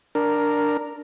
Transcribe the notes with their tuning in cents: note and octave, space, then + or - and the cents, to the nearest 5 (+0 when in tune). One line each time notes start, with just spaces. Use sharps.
D4 +0 A#4 +0